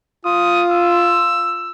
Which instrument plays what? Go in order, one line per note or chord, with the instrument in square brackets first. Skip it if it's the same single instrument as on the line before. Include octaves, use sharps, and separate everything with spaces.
[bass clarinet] F4 [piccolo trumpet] D#6
[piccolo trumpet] E6